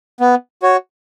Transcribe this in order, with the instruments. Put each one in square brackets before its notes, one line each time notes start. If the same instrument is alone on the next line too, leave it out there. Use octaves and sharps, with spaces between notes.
[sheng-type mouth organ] B3
F#4 C#5